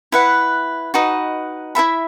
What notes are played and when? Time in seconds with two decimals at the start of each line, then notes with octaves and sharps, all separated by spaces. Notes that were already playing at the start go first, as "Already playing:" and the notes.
0.12 E4 B4 F#5
0.94 D#4 F#4 B4 D#5
1.75 E4 A#4 E5 B5